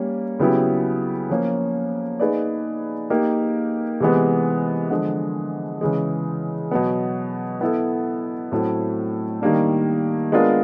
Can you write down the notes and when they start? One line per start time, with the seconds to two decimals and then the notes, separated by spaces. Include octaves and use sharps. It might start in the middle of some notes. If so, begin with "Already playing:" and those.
Already playing: G3 A#3 C#4
0.39 C#3 F#3 B3 E4 G4
1.30 F3 A#3 C#4
2.20 A#3 D#4 G#4 B4 D5
3.10 A#3 D#4 G4 A#4
4.00 C3 E3 G#3 B3
4.90 D3 F3 G#3
5.81 C#3 E3 G#3
6.71 B2 F#3 B3
7.61 B3 E4 A4
8.52 A2 F#3 A3 C4 E4
9.41 D#3 G3 A#3 D4
10.32 G#3 B3 D4 F4 A#4